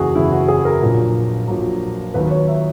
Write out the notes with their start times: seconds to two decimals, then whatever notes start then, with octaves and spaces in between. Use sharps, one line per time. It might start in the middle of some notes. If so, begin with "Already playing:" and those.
Already playing: F#1 E2 C#3 F#4 G#4
0.15 F#1 E2 C#3 E4
0.32 F#4
0.48 G#4
0.65 A#4
0.82 A#1 A#2 F#3
1.47 A#1 A#2 F#3
2.14 D#2 D#3 F#3 B4
2.31 C#5
2.48 E5